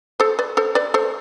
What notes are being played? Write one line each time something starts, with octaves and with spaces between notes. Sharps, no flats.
A4 C5
B4 D5
A4 C5
B4 D5
A4 C5